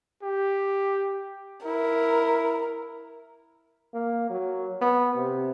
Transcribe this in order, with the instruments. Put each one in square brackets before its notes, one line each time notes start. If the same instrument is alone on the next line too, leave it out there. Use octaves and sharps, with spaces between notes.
[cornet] G4
[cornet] E4 [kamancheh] A#4
[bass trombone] A#3
F#3
B3
C3